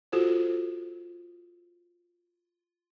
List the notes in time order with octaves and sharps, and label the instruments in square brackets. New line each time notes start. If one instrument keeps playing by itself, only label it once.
[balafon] F4 F#4 A4 C5